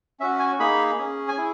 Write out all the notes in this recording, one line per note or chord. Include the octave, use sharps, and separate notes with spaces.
C#4 F#4 E5
G#5
A#3 D#4 G#4 B5
C#4 G#4
G#5
E4 G#4